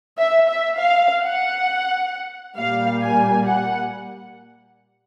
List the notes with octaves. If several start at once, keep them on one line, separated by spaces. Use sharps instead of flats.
E5
E5
F5
F#5
A#2 G3 A#3 F5
G#5
F#5